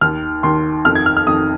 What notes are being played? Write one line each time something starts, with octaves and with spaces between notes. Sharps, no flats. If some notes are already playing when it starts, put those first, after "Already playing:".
D#2 D#3 F6
D#2 D#3 C6
F2 D#3 F6
G#6
F6
F6
F2 D#3 D#6